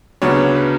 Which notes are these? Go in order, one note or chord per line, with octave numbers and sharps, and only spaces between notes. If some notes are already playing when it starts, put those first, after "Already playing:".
D2 C#3 F#3 B3 D4 C#5
B4